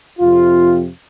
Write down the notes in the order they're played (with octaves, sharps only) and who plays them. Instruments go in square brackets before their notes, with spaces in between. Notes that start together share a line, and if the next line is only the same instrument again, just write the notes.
[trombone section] F2 C3 F3 C4 F4